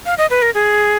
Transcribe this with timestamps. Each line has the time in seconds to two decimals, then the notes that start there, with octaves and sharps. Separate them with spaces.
0.06 F5
0.18 D#5
0.30 B4
0.42 A#4
0.54 G#4